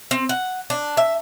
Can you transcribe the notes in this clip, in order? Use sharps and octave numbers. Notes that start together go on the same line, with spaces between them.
C4
F#5
D4
E5